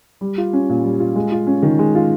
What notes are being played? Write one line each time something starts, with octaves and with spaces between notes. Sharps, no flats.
G3
F4
C#4
A#2
G3
F4
G#3
F4
C#4
D#3
G#3
F4